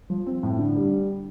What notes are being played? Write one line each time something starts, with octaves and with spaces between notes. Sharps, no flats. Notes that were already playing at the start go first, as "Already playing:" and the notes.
F3
C4
A2
D3
G3